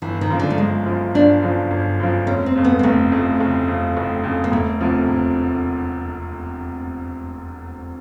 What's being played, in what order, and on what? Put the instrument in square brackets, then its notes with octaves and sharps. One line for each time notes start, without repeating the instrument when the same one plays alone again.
[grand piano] G1 [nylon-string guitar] E3
[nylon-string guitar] D#3
[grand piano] F#2 C#3 F3
[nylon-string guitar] D3
A3
[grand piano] G1 [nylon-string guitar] G#3
[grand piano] F#2 C#3 F3
[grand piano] G1 [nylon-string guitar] D4
[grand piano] F#2 C#3 F3
G1
F#2 C#3 F3
[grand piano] F1 [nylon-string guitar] C#4
[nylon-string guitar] C4
[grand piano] F2 C#3
[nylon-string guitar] B3
A#3
[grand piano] F1 [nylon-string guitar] A3
[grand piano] F2 C#3
F1
F2 C#3
F1
F2 C#3
[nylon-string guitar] A#3
[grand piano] E1 [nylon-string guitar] A3
[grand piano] D2 C3 F3
E1